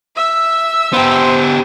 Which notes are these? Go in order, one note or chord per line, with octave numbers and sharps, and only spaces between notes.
E5 E6
B3 G4 C5